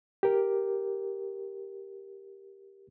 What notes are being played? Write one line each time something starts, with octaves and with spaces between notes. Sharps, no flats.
G4 A#4